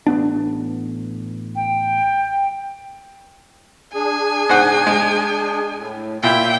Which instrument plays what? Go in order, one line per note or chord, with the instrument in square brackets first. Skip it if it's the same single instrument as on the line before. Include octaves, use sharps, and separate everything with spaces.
[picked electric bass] A1 B3 D4
[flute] G5
[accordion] D4 G#4 [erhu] G#5
[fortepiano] G#2 C5 F#5
G#3
[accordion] A2
[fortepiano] A#2 E4 [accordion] E5 [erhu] G5